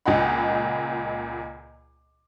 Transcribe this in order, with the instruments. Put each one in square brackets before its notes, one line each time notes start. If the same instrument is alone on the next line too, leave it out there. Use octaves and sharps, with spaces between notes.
[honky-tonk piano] C#2 A#2 D#5 F#5 B5